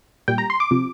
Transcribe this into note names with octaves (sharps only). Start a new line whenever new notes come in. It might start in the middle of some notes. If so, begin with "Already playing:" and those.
A#2 G3 G5
A#5
C6
D6
C3 F3